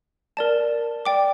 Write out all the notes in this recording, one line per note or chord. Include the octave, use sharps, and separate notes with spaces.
A#4 D5 A5
D5 G5 D6